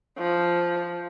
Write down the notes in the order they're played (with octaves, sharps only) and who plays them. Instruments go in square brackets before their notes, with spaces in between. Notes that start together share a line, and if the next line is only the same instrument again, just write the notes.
[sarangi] F3